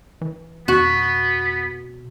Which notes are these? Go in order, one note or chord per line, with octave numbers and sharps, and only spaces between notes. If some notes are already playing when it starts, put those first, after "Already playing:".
E3
F2 B2 B3 F#4